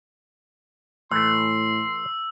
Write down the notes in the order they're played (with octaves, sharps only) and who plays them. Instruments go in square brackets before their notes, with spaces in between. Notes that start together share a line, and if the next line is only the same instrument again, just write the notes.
[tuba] A2 [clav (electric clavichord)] E3 A3 [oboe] C6 [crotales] E6